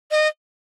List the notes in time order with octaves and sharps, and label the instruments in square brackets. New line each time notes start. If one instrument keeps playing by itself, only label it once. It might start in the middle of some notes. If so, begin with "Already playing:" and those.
[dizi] D#5